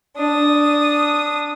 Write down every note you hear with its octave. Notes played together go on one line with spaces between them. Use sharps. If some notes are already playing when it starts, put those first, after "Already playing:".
D4 D#6